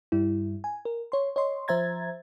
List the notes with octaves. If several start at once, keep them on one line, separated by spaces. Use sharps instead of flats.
G2 G3 E4
G#5
A#4
C#5 C6
C#5 D#5 C6
F3 C5 E5 A#5 G#6 A6